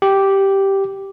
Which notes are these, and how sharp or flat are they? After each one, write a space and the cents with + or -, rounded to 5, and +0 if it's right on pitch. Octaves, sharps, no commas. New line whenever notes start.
G4 -5